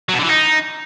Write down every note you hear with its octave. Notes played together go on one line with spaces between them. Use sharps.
F#3
B2
D3
E3
D#4